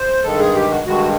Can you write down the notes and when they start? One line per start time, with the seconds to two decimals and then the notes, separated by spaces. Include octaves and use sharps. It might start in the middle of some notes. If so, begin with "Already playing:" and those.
Already playing: C5
0.24 G2 D#3 G#3 A4
0.40 G#4
0.55 G4
0.71 F#4
0.86 G2 D#3 G#3 F#4